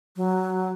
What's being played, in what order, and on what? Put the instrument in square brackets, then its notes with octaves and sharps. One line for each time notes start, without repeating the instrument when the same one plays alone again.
[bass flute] F#3